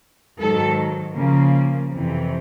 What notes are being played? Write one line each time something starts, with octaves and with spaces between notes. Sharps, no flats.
G#2 D#3 F#3 A4
C#3 F3 A#3
F2 C3 E3